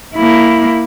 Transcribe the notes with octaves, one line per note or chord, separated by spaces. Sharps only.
A#3 E4